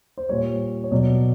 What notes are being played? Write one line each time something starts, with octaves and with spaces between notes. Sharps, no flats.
C5
A#2 G3 C#5
C#5
B2 F#3 D5